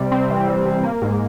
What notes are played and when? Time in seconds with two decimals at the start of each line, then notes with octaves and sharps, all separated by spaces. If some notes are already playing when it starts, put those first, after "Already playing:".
Already playing: C3 G3
0.12 C4
0.30 E3
0.48 G3
0.65 C3
0.84 A#3
1.02 G#2